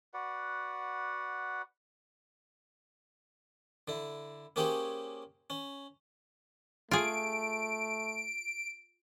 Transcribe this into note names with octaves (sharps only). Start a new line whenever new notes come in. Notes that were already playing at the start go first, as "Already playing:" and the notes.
F#4 B4 D5 F#5
D3 E4
A#3 C#4 G4 G#4 C5 C#5
C#4
A3 F4 G#4 D7